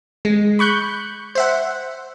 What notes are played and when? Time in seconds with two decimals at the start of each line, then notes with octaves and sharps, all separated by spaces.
0.25 G#3
0.59 B5 C#6 F#6 G6
1.35 C5 E5 F#5